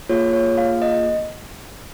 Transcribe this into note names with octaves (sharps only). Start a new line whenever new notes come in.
A#3 F4 G#4 C#5
C#5
F5
D#5